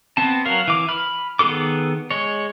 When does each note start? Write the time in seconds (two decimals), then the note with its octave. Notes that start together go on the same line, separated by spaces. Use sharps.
0.17 B3 C4 A5
0.46 F#3 F#4 A#4 F5
0.68 E3 D6
0.89 B5 F6
1.39 D#3 B3 G#4 A4 D6
2.11 G#3 C#5